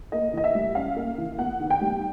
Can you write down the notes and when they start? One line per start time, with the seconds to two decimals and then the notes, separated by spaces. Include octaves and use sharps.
0.12 A#3 D#5
0.33 E3 D#5
0.44 E5
0.55 G3
0.75 C#4 F5
0.96 A#3
1.18 E3
1.39 B3 F#5
1.60 D#3
1.70 G5
1.81 G3